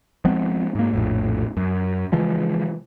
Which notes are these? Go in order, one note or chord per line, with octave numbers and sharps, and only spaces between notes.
F3 G#3 B3 C4
G#2 A#3
A#1 F2 A2
F#2
C#3 E3 F3 G#3